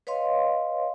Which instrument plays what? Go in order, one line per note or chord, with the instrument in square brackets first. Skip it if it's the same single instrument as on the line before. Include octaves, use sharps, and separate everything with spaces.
[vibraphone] B4 C#5 D#5 F5 C6